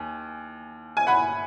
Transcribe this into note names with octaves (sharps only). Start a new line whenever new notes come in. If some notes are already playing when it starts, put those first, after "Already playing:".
Already playing: D#2 G#5
G#5
F#5 B5